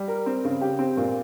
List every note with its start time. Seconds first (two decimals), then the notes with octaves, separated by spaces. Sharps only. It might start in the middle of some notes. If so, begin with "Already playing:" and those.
Already playing: G3
0.08 A#4
0.26 C4
0.45 C#3
0.61 G4
0.79 C4
0.97 A#2